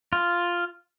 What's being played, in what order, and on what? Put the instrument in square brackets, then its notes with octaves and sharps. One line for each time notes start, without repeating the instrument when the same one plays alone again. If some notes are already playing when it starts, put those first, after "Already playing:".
[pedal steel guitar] F4